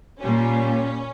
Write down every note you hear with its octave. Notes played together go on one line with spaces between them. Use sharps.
A#2 G3 C#4